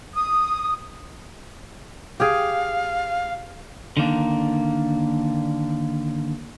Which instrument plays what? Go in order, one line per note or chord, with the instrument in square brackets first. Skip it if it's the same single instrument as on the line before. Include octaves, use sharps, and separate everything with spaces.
[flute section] D#6
[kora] G4 G#4 [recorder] F5
[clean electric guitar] D3 D#3 A#3 D4